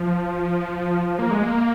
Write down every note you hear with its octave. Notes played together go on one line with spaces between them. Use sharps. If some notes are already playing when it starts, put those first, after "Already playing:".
Already playing: F3
A#3
G#3
A#3